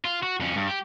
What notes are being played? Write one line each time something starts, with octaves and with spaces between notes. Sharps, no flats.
F4
F#4
F2 C#4
G2
G4